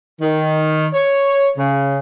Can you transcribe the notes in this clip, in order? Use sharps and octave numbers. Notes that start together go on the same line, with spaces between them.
D#3
C#5
C#3